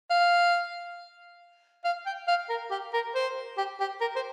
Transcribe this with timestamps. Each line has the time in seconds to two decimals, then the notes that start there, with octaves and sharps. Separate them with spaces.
0.11 F5
1.85 F5
2.06 G5
2.28 F5
2.49 A#4
2.71 G4
2.94 A#4
3.15 C5
3.58 G4
3.80 G4
4.01 A#4
4.16 C5